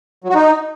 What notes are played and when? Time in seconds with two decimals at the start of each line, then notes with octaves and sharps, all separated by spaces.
0.24 F#3
0.29 F#4
0.34 D#4